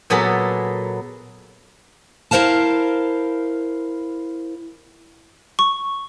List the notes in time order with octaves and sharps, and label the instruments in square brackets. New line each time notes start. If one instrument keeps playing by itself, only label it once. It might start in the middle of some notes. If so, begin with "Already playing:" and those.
[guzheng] A#2 F#3 B3 G#4 A4 B5
[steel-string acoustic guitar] E4 A#4 C5 F5 A5
[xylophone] C#6